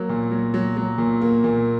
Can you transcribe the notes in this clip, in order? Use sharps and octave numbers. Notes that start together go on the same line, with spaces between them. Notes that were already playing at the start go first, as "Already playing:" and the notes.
Already playing: F#3 A#3
A#2
F#3
F#3
F#3
A#2
A#3
A#2